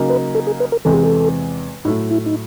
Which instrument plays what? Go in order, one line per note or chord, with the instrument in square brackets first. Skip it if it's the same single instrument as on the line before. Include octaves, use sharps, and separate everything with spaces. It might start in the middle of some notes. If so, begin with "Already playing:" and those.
Already playing: [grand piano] C#3 F#3 A#3 D#4
[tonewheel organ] B4
A4
G#4
B4
A#4
[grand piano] E2 C3 E3 G#3 C4 [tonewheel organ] A4
[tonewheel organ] G#4
A4
[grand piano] A2 F#3 A3 [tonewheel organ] D#4
[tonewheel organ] E4
D#4